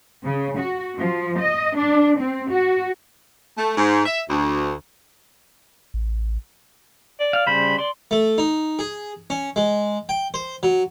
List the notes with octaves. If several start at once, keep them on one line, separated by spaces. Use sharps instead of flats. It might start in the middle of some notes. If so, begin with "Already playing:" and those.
C#3
F#4
F3
D#5
D4
C4
F#4
A3
G#2
E5
D2
A1
D5
F5
C#3 G3 C5 B5
D5 C6
A3
D#4
G#4
C#4
G#3
G5
C5
F#3